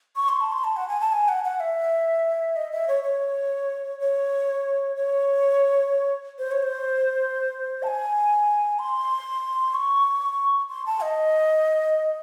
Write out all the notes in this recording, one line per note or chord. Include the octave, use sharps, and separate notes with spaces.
C#6
C6
A5
C6
A5
F#5
G#5
A5
G#5
F#5
F#5
E5
D#5
E5
C#5
C#5
C#5
C#5
C5
C#5
C5
A5
G#5
C6
C#6
C6
A5
D#5